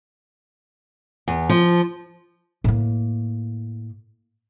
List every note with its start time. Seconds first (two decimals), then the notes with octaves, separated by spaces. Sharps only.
1.28 E2
1.49 F3
2.64 A2 A#3